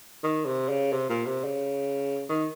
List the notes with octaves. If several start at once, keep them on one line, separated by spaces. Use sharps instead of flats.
D#3
C3
C#3
C3
A#2
C3
C#3
D#3